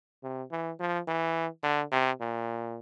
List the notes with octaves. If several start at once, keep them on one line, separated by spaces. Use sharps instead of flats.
C3
E3
F3
E3
D3
C3
A#2